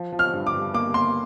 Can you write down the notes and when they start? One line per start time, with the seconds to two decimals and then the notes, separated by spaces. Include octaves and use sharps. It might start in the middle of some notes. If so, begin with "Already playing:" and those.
Already playing: F3
0.12 F3
0.19 F6
0.33 G2
0.47 D6
0.54 G2
0.74 A#3 D6
0.94 A#3 C6